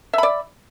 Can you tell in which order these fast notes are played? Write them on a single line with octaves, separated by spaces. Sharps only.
E5 B5 D5